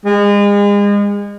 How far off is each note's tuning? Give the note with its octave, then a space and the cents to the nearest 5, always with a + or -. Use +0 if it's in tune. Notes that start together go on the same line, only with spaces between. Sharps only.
G#3 -35